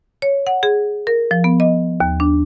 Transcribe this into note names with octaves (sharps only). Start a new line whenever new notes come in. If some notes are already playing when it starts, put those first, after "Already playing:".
C#5
F#5
G#4
A#4
F3
B3
D#5
D#2
D4